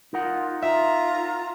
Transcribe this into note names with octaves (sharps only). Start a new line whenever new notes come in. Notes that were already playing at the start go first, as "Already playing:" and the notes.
D#4 F4 A#4 F#5
F4 E5 A#5